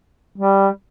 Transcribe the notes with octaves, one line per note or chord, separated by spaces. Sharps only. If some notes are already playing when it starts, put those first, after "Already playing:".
G3